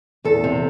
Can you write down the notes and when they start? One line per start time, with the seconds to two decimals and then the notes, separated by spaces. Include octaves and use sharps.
0.25 E2 A4
0.44 C3